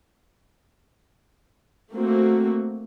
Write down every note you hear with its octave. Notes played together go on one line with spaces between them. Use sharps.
A3 A#3 C4 F#4